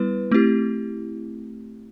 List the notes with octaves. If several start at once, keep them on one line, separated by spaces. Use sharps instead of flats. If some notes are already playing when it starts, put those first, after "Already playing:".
Already playing: G3 B3 E4 B4
A3 C4 E4 G4